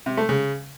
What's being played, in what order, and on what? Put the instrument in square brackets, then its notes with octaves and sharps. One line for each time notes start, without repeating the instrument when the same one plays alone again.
[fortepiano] C3
A3
C#3